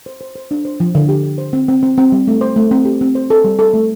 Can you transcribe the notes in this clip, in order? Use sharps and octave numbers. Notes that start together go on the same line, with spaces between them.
C5
C5
C5
D4
C5
F3
D3
G4
G4
C5
C4
C4
C4
C4
G3
A3
C5
A3
C4
G4
C4
C5
A4
G3
A4
A3